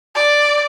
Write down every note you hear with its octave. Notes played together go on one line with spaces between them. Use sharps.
D5